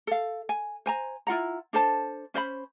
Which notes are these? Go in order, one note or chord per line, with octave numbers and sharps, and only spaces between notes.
A4 F5
G#5
C5 G#5 A#5
E4 F4 F#5 A#5
D4 A4 C5 A5
C#4 C5 D5 B5